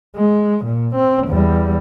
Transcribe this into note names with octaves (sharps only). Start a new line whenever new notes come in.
G#3
A#2
C4
E2 G3